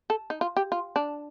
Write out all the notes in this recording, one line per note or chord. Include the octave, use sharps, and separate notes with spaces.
A4
D#4
F4
G4
F4
D4